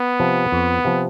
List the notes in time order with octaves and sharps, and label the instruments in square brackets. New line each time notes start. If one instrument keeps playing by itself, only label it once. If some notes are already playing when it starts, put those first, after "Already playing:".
Already playing: [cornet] B3
[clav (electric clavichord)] C3 F3
F2
C3 F3